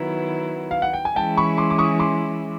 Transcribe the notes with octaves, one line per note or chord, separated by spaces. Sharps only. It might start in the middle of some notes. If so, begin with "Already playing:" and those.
Already playing: D#3 F#3 B3 E4 A#5
F5
F#5
G5
G#5
E3 G#3 C#4 E4 G5 A5
B5 C#6
C6 D6
D6
C#6 D#6
C6 D6